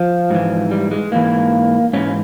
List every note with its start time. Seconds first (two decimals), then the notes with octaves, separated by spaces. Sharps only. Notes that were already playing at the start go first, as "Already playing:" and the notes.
Already playing: F3
0.30 G#2 E3
0.71 G3
0.91 G#3
1.12 G#2 E3 A#3
1.93 G#2 E3 C#4